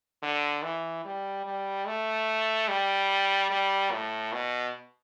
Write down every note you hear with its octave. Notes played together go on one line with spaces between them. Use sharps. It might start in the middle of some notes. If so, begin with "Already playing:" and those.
D3
E3
G3
G3
A3
G3
G3
A2
B2